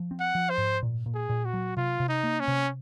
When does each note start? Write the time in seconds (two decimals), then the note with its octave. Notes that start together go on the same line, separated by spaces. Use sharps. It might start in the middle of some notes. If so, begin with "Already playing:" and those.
Already playing: F3
0.11 C4
0.20 F#5
0.35 F3
0.50 C5
0.58 G#2
0.83 A#2
1.06 A#2
1.14 G#4
1.30 A#2
1.45 F#4
1.54 F#3
1.77 C3 F4
2.00 C3
2.09 D#4
2.24 A#3
2.40 C#4
2.48 C3